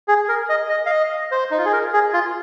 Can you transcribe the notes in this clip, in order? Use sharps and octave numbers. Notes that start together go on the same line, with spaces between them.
G#4
A#4
D#5
D#5
F5
D#5
C5
D#4
F4
G#4
A#4
G#4
F4